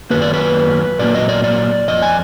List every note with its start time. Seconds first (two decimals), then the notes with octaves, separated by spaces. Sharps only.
0.10 F#2 D#3 F#3 A#3 B4
0.22 D5
0.34 B4
0.99 A#2 F#3 A#3 D5
1.14 D#5
1.29 D5
1.44 D5
1.88 F2 F3 D#5
2.02 G#5